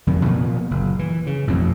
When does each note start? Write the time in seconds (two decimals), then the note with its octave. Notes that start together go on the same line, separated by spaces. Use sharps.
0.07 F2 C3 D#3 F#3
0.26 A#2 F3 A#3 B3
0.71 F#1
0.99 E3
1.27 C#3
1.47 A1 F2 B2 C4